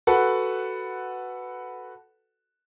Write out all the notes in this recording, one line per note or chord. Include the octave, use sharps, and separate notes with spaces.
F#4 A4 B4 F#5